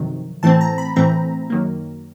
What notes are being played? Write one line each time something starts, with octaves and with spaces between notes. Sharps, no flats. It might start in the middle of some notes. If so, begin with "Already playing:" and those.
Already playing: G1 F2 C3 D#3 F#3
A2 E3 A3 C4 A5
A#5
B5
A2 E3 A3 C4 A#5
F#2 D#3 F#3 A#3